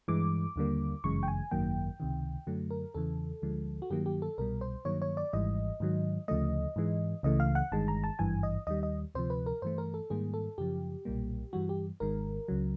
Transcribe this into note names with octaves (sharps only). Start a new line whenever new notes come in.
G2 E3 G#3 D6
D#2 D3 G3 A#3
G1 F#2 C#3 E3 G#3 C#6
G5
G#5
G#1 F#2 D#3 F#3 A#3 G5
C#2 C3 D#3
F#2 D3 F#3 A3
A#4
E2 C#3 E3 A4
D2 D3 F3 G#3
F#4
G2 D#3 F#3 A#3 G4
G4
A4
C2 B2 G3 A#4
C5
G2 D#3 F#3 A#3 C#5
C#5
D5
G#1 G#2 E3 G3 D#5
G#2 D#3 F#3
D2 C#3 F3 A3 D#5
G#2 E3 G#3
C#2 C#3 E3 A3 D#5
F5
F#5
G1 G2 D#3 G#3 A5
A#5
A5
G#1 G2 E3 G#5
D#5
D#2 D#3 G3 D#5
D#5
D2 C3 F3 C5
B4
A#4
G2 E3 A3 C5
A#4
A4
G#2 D#3 G3 A#3 G#4
A4
F#2 C#3 F3 G4
B1 A#2 G3 A#3
G2 E3 G3 F#4
G4
G#1 G#2 D#3 G#3 A#4
C#2 C#3 F#3